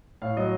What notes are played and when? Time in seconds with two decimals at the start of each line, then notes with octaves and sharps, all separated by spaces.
0.22 A2 F5
0.37 F#3 D#5